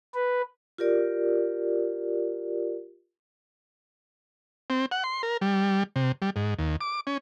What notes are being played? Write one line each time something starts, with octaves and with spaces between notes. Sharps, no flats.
B4
F4 G4 A#4 D5
C4
F#5
C6
A#4
G3
C3
G3
G#2
D#2
D6
C#4